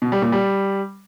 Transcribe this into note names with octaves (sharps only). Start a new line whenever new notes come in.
B2
G3
A#2
G3